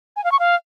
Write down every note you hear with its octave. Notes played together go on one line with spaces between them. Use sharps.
G#5
F5
C#6
F5